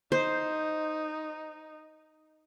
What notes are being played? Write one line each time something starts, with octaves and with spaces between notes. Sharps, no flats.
D#4 C5